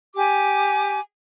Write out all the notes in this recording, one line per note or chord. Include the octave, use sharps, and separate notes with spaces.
G4 G#5 D6